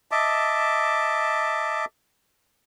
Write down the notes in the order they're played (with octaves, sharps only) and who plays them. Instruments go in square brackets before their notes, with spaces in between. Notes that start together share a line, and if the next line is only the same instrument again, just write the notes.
[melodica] D#5 E5 A5 D6